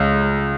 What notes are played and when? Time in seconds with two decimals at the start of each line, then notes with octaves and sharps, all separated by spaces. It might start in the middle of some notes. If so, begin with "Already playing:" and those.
Already playing: C#2